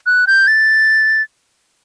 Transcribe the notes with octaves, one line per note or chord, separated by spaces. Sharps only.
F#6
G6
A6